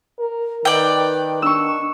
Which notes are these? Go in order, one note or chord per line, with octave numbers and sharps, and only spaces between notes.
A#4
D#3 B4 D5 G5
D4 C#6 E6